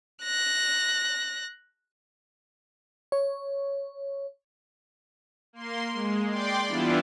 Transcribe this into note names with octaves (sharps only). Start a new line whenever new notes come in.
F#6 A#6
C#5
A#3 C6
G#3
D5 G5 C6 D6
E3 G3 B3 D4 E4 F4